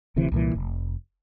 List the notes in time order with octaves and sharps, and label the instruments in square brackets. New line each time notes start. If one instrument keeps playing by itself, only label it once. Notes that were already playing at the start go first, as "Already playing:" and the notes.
[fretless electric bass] D1 D2 C3 E3
C2 A#2 E3
F1